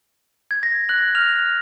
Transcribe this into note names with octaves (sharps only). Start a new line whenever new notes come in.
G#6
A#6
F#6 F#7
F6 F7